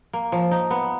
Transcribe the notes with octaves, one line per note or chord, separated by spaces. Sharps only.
A#3
F3
D#4
B3